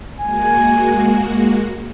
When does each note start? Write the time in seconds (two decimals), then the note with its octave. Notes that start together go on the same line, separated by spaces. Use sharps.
0.20 G#3 A#3 F#4 G#5